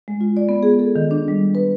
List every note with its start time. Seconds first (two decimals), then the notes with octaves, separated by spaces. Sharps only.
0.08 G#3
0.21 F4
0.37 D5
0.49 B3
0.63 G#4
0.79 A4
0.96 D#3
1.11 D4
1.28 G3
1.55 B4